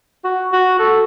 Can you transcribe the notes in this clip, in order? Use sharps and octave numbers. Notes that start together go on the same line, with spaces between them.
F#4
F#4
A4